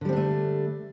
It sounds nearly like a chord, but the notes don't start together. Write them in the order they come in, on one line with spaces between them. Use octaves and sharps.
D3 G3 C4 D4 A3